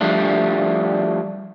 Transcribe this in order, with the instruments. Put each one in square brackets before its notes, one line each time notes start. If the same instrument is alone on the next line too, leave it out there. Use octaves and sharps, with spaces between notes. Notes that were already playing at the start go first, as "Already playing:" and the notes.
[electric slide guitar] F3 G3 A3 D4